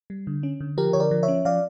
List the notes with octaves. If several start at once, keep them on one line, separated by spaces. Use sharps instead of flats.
G3
D3
C#4
D3
F3 G4 A#4
D3 C#5
A#4 D5
F3
C#5 E5
C#4
F3 D5 F5